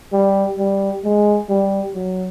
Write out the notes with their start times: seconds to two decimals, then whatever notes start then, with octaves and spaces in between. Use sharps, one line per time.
0.13 G3
0.58 G3
1.04 G#3
1.49 G3
1.95 F#3